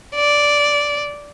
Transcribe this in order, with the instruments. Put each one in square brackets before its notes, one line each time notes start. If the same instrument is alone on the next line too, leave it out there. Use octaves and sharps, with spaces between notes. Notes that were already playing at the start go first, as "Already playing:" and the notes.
[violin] D5